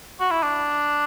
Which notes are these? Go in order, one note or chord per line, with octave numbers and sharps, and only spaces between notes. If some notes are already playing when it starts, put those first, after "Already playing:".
F#4
E4
D4